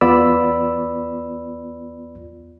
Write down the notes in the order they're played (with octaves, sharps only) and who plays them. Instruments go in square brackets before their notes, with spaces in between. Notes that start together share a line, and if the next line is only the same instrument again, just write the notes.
[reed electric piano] E2 B3 F4 D5 B5 E6